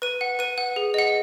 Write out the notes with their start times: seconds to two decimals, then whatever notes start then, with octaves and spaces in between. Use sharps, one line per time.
0.02 B4 D#7
0.21 F#5
0.39 B4 D#7
0.58 F#5
0.76 G#4
0.94 D#5 F#5